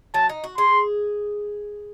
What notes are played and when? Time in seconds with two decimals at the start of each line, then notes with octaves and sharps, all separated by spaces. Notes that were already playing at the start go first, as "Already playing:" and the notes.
0.14 F#3 A5
0.29 D#4
0.44 F#4
0.58 G#4 C6